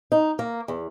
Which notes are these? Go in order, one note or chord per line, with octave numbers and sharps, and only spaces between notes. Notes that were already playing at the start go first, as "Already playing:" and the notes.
D#4
A#3
E2